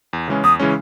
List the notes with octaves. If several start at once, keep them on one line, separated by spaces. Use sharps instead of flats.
E2
C#3 E3 G#3 C#4
E2 D#6
C#3 E3 G#3 C#4